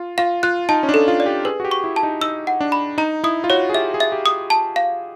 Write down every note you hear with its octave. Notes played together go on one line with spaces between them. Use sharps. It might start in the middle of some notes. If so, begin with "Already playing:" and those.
Already playing: F4
F4 F5
F4 F#6
D#4 A5
C#4
D4
A4
F4
D5
G4
G#4 B4
F#4
G4
C#6
E4
A5
D#4
D#4 E6
F#5
D4
B5
D#4 A#5
E4 D#6
F4
F#4 C#5
G#4
G4 E5
G#4
E5
G4
D#6
A5
F5